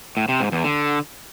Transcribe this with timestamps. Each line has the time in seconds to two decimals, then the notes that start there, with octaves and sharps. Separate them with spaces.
0.17 A2
0.29 C3
0.40 G#2
0.52 E2
0.64 D3